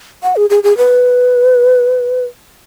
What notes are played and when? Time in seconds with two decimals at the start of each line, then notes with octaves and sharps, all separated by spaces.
0.23 F#5
0.36 G#4
0.50 G#4
0.63 G#4
0.77 B4